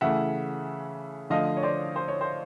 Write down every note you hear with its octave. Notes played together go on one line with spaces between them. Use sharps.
C#3 E3 A3 E5 F#5
D3 F3 A3 D#5 F5
C#5
C5 D5
C5
C#5
C5